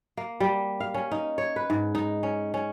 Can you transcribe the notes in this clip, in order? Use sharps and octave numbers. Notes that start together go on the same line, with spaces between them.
A#3
G3
F5
C#4
D#4
C#5
B4
G#2
D#4
C#4
C#4